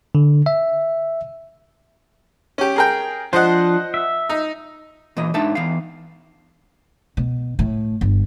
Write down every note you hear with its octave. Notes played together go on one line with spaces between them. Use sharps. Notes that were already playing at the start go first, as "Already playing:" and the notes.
D3
E5
C#4 G4
G#4 A#4 G5
F3 D4 F4 C5 D#5 F#5
E5
D#4
A#2 E3 D#5
G#2 D4 D#4 E5 A5
E2 F5
B2
A2
G1